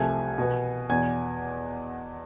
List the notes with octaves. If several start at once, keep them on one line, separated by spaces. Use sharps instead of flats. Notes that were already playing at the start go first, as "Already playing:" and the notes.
Already playing: C2 C3 F3 A3 G#5 G#6
B2 B3
E2 B2 B3 G#5 G#6